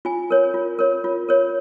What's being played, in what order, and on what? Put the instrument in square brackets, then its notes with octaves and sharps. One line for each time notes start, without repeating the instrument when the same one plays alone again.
[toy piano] F4 G#5
A#4 C#5
F4
A#4 C#5
F4
A#4 C#5